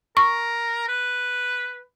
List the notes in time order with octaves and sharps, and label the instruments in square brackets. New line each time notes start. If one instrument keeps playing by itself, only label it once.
[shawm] A#4 [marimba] C#6
[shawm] B4